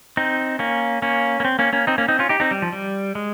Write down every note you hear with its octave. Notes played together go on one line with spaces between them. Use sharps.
C4 D#4
A#3 C#4
A#3 C#4
A#3
C4
A#3 C#4
A#3 C#4
C4 D#4
A#3 C#4
C4 D#4
C#4 F4
D#4 G4
C4 D#4
G3
F3
G3
G#3